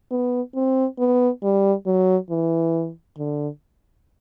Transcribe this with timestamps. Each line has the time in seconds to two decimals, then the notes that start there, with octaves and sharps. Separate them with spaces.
0.11 B3
0.55 C4
0.99 B3
1.43 G3
1.86 F#3
2.30 E3
3.18 D3